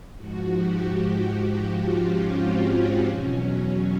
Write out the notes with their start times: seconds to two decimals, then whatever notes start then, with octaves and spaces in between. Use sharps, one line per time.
0.16 G#2 F3 F#4
0.53 G4
0.88 G4
1.25 F#4
1.61 F4
1.97 C#4
2.33 C4
2.70 C4
3.05 E2 B2 F#3 C#4
3.42 C#4